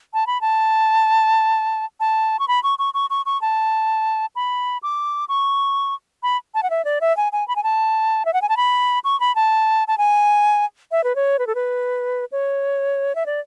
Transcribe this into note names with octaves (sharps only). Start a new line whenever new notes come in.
A5
B5
A5
A5
C#6
B5
C#6
C#6
C#6
C#6
C#6
A5
B5
D6
C#6
B5
A5
F#5
E5
D5
E5
G#5
G#5
B5
G#5
A5
E5
F#5
G#5
A5
B5
C#6
B5
A5
A5
G#5
E5
B4
C#5
B4
A4
B4
C#5
E5
D5